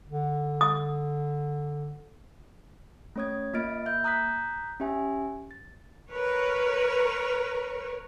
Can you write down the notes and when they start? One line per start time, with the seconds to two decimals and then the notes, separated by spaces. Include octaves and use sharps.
0.08 D3
0.61 D#6
3.16 A3 C#4 C#5 D#6 G#6
3.54 A#3 F4 D#5 F6 A6 D7
3.85 A#3 E5 G6
4.04 A#5 D#6 F#6 G6 B6
4.80 C#4 G4 E5 G#5
5.51 A6
6.11 A#4 B4 C#5